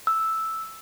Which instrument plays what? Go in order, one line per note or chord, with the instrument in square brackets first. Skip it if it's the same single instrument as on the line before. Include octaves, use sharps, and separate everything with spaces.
[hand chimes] E6